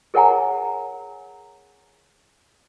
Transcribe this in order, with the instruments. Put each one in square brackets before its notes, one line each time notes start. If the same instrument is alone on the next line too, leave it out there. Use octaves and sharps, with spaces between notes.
[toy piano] G#4 A#4 C#5 F#5 G#5 A#5